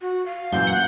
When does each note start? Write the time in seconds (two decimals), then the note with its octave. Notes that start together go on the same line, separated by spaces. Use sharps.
0.01 F#4
0.26 F5
0.52 F#2 A#2 E3 G6
0.67 F#5